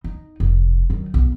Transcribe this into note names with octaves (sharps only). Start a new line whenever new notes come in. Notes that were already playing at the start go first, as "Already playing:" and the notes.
D#4
F1
D#3 F#3
B1